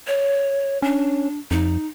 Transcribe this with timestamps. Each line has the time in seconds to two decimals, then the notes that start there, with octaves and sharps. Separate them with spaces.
0.07 C#5
0.82 C#4 D4
1.51 F2 D#4